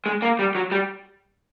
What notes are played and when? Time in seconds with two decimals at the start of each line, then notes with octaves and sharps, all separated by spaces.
0.06 G#3
0.22 A#3
0.39 G3
0.55 F#3
0.72 G3